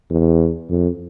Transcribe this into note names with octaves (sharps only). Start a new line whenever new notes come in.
E2
F2